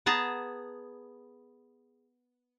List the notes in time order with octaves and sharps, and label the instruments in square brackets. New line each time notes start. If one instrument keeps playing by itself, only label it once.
[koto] B3 G#4 A5 A#5